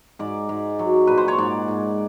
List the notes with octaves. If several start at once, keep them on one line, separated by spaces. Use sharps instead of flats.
G#2 D5
G#2
F#3
A#2 B4
C5
C#5
G#2 D5
G#2